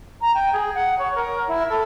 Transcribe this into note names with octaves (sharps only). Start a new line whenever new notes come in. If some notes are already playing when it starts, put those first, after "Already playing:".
A#5
G5
G#4
F#5
C#5
A#4
E4
A4